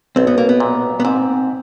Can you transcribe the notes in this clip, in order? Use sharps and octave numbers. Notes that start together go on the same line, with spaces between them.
B1 C4
B3
A#3
B3
A#2
B3
G#2 C4